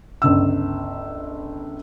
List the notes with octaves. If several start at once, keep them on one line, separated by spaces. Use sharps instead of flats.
G1 C#2 E6